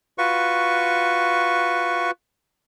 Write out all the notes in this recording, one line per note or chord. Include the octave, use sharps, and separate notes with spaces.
F4 F#4 B4 C#6